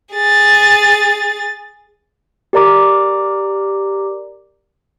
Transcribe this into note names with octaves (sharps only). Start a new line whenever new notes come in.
G#4 A6
G4 A#4 D5 A#5 D6